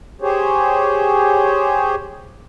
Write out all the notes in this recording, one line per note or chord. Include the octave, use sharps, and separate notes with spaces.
G4 G#4 C5 C#5